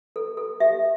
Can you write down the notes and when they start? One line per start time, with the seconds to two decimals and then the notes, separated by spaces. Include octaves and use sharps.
0.16 A4
0.37 A4
0.60 G4 E5